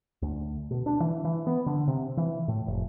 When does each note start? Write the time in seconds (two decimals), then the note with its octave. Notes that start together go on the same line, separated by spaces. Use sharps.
0.22 D2
0.71 B2
0.86 D4
1.00 E3
1.24 E3
1.47 B3
1.66 D3
1.88 C3
2.17 E3
2.48 A2
2.67 F1